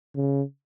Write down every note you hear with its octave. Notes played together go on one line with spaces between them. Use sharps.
C#3